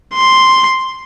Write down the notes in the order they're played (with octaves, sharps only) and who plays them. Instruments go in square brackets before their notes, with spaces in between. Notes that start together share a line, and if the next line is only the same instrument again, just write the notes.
[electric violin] C6